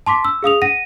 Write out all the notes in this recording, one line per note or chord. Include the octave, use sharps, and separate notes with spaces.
A5 C6 D6 B6
E6
G#4 F5 D#6 F7
F#5 A#6 D#7